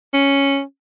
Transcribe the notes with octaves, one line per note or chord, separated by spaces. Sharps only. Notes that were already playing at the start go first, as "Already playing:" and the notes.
C#4